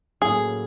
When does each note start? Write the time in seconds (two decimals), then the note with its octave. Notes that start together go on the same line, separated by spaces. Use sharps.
0.21 A2 F#3 A#3 C#4 F#4 G#4